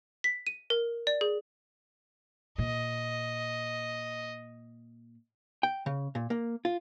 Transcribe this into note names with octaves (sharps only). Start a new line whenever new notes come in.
B6
D#7
A#4
D5
G#4
A#2 D#5
G5
C#3
A#2
A#3
F4